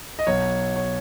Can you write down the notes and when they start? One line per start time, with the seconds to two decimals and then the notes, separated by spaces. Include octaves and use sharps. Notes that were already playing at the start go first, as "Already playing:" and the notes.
0.19 D#5
0.27 B1 B2 F#3 C#5
0.76 C#5